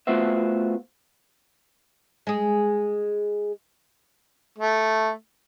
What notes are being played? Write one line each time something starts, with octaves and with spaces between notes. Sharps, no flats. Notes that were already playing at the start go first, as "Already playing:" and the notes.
A3 B3 F4 F#4 C5 E5
G#3 G#4
A3